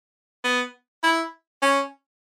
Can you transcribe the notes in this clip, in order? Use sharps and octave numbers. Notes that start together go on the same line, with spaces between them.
B3
E4
C#4